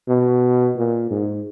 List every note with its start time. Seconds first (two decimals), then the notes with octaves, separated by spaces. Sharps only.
0.08 B2
0.77 A#2
1.11 G#2